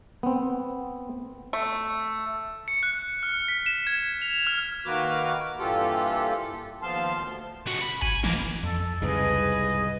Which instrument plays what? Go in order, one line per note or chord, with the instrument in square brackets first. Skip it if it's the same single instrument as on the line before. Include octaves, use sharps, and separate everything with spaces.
[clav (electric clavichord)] B3 C4
[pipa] A3
[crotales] C#7
F#6
F6
B6
E7
G#6
F7
F6
[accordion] D#3 A#3 F#4 B4 D6 F6
G2 A#2 E3 F4 G4 A4
D#2 F3 B3 F5 A5 C6
D2
[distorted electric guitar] C#2 F#4
B5
[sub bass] G#1 [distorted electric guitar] G#5
[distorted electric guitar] G#2 A#3 [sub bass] E3
[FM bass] F2 [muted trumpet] A4
[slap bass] C2 G#2 C#3 [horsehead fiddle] G#4 B4 [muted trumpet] D#5